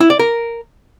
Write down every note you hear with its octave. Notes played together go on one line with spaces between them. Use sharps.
E4
D5
A#4